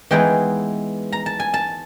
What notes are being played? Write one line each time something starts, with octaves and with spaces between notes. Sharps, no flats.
E3 G#3 B3 D#4 G5
A#5
A5
G#5
A5